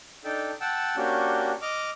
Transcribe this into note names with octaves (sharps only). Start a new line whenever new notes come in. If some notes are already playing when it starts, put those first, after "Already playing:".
D4 D#4 A4 G5
F#5 G5 A5 E6
A#3 C#4 D4 F#4 G4
D#5 D6 F6